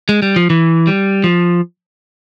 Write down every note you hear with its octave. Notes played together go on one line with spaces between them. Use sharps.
G#3
G3
F3
E3
G3
F3